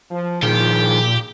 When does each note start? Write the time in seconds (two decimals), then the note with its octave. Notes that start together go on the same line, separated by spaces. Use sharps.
0.11 F3
0.43 A#2 D#3 F3 F4 G4 G#4